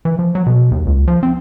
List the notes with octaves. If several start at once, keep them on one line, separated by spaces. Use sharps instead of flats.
E3
F3
F#3
B2
D#2
C#2
F3
C4